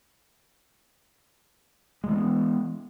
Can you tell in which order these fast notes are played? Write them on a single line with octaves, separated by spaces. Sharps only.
G#3 E3 C4 B3